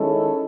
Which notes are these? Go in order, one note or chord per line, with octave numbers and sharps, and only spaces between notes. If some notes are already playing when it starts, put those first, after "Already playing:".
Already playing: D#3 G#3 C#4 E4 A4